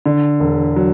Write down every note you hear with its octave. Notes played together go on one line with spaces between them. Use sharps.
D3
E1
F#3